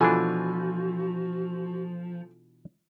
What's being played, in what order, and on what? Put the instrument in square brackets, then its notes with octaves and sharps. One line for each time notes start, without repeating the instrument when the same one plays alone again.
[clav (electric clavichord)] B2 E3 D4 [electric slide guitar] F3 [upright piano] F4 A4 G#5 [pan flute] F#4